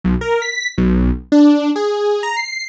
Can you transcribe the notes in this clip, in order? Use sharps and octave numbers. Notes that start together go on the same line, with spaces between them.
B1
A#4
B6
B1
D4
G#4
A#5
C7